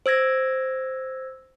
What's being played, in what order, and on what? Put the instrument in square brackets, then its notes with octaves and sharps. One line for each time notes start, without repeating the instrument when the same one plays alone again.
[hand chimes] C5 E6 G#6 A#6